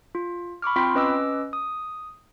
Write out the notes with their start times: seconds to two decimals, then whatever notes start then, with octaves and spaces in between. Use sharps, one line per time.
0.15 F4
0.62 B5 C#6 D6 F6
0.76 C4 F4 G5 B5 C6 B6
0.95 C#4 B4 D#5 D6 E6
1.53 D#6